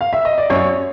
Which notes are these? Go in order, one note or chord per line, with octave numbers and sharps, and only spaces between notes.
F5
E5
D#5
D5
F#2 C#5